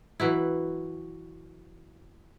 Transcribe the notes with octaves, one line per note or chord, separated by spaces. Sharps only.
E3 F#3 E4